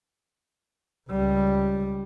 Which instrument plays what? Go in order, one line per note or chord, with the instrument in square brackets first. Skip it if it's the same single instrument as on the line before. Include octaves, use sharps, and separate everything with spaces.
[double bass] C#2 G3